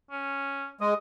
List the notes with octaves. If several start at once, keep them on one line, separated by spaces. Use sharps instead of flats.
C#4
G#3 D#5